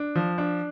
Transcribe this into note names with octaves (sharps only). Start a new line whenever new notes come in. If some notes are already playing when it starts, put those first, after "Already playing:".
Already playing: D4
F3
D4